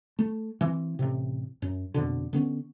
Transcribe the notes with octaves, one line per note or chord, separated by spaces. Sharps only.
A3
E3 C4
A1 C3
F#2
A#1 F2 B2 D3
D3 B3 C#4